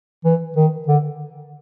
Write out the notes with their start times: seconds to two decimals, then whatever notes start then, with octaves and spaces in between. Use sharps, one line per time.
0.25 E3
0.56 D#3
0.88 D3